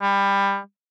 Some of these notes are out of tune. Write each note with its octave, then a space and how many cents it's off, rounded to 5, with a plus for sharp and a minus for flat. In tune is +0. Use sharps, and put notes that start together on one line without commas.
G3 +20